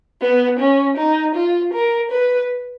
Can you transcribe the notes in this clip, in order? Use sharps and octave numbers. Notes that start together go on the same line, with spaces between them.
B3
C#4
D#4
F4
A#4
B4